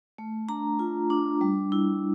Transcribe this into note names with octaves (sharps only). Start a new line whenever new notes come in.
A3
D4 A#5
F4
D4
G3
E4